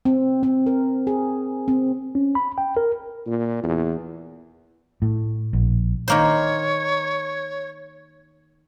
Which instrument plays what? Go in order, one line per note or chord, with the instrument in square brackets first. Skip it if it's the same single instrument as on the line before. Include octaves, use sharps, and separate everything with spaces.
[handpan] C4
C4
A#4
G#4
C4
[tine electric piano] C#4
B5
G5
A#4
[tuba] A#2
E2
[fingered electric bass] A2
A#1
[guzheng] D#3 A#3 C5 [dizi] C#5